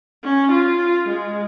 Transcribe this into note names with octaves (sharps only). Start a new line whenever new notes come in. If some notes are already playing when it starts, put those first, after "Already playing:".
C#4
F4
G#3